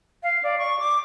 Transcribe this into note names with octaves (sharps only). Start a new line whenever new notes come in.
F5
D5
C#6
D6